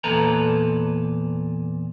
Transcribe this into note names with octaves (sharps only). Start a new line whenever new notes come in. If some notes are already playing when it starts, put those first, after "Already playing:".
E2 A#2 A4 B4 A#5